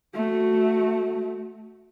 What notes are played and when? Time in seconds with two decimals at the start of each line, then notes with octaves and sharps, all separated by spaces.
0.14 A3 F#4